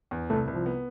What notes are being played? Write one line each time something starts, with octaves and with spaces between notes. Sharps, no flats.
E2
C2 A3
C2
F3
B3